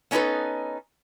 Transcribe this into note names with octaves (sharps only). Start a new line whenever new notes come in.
B3 C#4 D#4 G#4 A4 B4